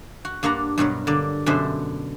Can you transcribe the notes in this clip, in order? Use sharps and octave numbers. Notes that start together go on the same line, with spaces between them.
F#4
G2 A#3 D4 F#5 A#5
G2 B2 F#3 A#4
D3 A#3 D5
F#2 B2 D3 D4 C5 E5